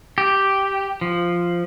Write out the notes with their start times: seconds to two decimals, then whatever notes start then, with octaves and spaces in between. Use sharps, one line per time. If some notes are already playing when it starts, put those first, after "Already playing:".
0.18 G4
1.01 F3